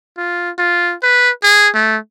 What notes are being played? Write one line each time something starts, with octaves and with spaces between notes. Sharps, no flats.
F4
F4
B4
G#4
A3